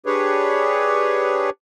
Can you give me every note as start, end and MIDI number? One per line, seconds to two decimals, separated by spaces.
0.06 1.50 62
0.06 1.50 67
0.06 1.50 68
0.06 1.50 71
0.06 1.50 73